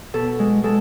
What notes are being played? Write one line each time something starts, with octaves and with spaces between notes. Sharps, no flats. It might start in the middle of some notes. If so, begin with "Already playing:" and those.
B2 A4
G#3
G#3 A4